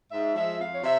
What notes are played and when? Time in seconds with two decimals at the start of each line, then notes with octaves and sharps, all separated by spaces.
0.11 G#2 E5
0.36 F3 G#3 E5
0.59 F2 F5
0.73 C#5
0.84 C3 E5